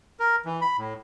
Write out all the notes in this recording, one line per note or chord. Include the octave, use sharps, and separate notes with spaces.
A#4
E3
B5
A2